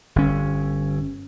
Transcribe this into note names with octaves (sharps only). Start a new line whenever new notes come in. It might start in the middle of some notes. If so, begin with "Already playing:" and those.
G1 C#4